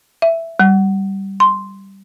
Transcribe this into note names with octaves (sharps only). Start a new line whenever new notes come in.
E5
G3
C6